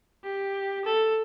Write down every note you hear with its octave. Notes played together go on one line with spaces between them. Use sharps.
G4
A4